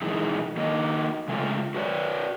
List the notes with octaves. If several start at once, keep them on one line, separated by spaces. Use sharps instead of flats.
A#2 E3 F3 G#3 D#4 E4
D#3 A#3 D#4 F#4 D#5
C#3 G#3 A3 F4
F#4 B4 C#5 D5